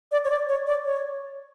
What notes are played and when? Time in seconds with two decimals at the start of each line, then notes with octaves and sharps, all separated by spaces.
0.12 D5
0.25 C#5
0.30 D5
0.49 C#5
0.67 D5
0.86 C#5